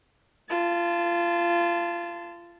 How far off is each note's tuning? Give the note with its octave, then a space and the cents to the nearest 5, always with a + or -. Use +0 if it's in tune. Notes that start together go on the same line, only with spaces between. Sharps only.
F4 -25 A5 +0